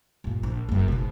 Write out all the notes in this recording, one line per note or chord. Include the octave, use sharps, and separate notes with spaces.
G2 A#2
A#1
F#1 F#2
G#2 B2